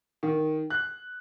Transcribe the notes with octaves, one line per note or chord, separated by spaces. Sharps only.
D#3
F#6